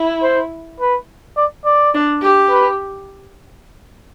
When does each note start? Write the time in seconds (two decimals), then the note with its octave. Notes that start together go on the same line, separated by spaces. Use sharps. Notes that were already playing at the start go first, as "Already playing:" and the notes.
Already playing: E4
0.23 C5
0.80 B4
1.37 D5
1.65 D5
1.94 D4
2.22 G4
2.50 B4